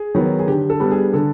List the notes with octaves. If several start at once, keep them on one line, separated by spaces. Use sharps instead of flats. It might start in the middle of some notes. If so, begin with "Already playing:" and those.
Already playing: G#4
D#3 F#3 B3
G#4
D3 G4
A4
G3 B3 D4
G#4
D3 A4